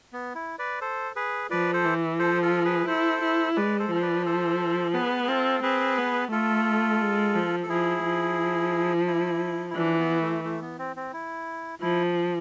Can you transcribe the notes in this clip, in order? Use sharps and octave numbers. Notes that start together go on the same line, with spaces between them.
B3
E4
B4 D5
A4 C5
G#4 B4
F3 B4 D5
A4 C5
E3
F3 A4 C5
F4 A4
G#4 B4
E4 A4 C5
E4
G#3 B4 D5
A4 C5
F3 C5
B4 D5
A4 C5
B3 G#4 B4
G#4
C4 F4 A4
C4 G#4 B4
B3
A3 F4 A4
G#3
F3
A4
F3 E4 G#4
F3
E4
E4
E3 D4
B3
A3
A3
B3
C4
C4
E4
F3 E4